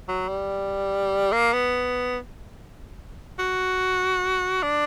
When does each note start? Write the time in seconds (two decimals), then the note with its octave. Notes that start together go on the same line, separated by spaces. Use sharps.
0.08 F#3
0.28 G3
1.32 A#3
1.53 B3
3.39 F#4
4.62 D4